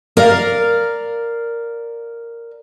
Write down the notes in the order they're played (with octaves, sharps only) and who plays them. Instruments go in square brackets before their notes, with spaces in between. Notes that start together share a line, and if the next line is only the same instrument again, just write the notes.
[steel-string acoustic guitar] A#4 D5 F5